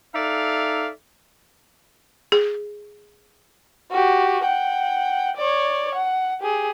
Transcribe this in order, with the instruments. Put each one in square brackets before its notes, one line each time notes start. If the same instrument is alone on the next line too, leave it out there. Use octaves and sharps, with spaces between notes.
[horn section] D#4 A4 D5 E5 F5
[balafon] G#4
[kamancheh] F#4 G4
F#5 G5
C#5 D5
F#5
G4 G#4